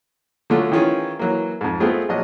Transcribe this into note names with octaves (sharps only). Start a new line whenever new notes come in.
D3 F#3 A3 F4 G#4
D#3 E3 C#4 F4 G#4
E3 F#3 A#3
F2 G#2
G#3 A3 B3 C4 F4 G#4
A#1 F#3 D#5